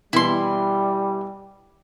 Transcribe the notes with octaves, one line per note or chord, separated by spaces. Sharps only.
B2 E3 G3 E4 C6